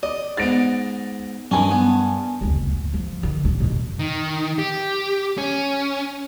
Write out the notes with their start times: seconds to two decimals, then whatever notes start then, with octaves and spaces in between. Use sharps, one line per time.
0.03 D5 D#5
0.37 G#2 B3 A6 A#6 D7
1.51 G2 D#3 C#4 G#5
1.71 B3
2.41 F#1 D2
2.67 D2 G#2
2.94 F3
3.23 D3 D#3
3.45 A2 D4
3.60 F2 B2
3.99 D#3
4.59 G4
5.38 C#4